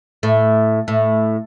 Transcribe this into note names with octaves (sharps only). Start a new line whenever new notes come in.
A2
A2